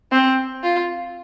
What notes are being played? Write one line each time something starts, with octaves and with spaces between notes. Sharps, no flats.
C4
F4